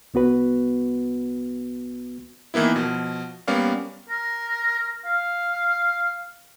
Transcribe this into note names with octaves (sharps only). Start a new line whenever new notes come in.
C2 B3 F#4 B4
D#3 E3 A#3 B3 E4
B2 F3
G3 A#3 B3 C#4 D5 F5
A#4
F5